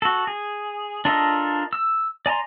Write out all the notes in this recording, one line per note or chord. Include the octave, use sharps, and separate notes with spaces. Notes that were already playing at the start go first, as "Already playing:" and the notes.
F#4 A4
G#4
D4 F4 A4 A#4 D#5
E6
D5 G#5 A#5 C6